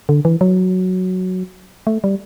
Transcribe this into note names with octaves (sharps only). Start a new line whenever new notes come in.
D3
E3
F#3
A3
G3